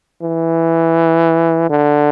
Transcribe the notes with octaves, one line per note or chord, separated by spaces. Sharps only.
E3
D3